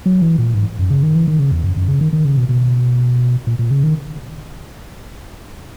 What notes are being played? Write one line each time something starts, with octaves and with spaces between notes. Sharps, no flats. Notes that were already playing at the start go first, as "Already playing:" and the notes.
F#3
E3
A#2
G#2
F#2
C#3
D#3
E3
D#3
C#3
E2
F#2
F#2
C#3
D#3
D#3
C#3
B2
B2
A#2
A#2
C#3
D#3